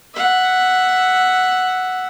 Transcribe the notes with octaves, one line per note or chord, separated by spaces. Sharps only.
E5 F#5